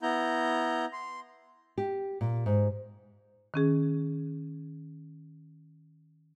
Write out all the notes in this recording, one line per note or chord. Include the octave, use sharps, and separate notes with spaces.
B3 E4 A#5 G6
C6
G4
A#2
G#2
D#3 C#4 G#4